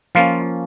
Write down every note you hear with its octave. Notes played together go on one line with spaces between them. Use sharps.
F3 A#3 C#4 F4